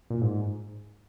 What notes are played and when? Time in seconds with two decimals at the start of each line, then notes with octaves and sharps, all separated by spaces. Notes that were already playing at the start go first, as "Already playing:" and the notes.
0.10 A#2
0.21 G#2